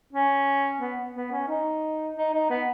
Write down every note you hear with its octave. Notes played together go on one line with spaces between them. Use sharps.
C#4
B3
B3
C#4
D#4
D#4
D#4
B3